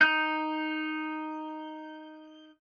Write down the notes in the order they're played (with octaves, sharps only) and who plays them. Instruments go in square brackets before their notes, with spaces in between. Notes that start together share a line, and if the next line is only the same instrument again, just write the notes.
[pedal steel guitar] D#4 G6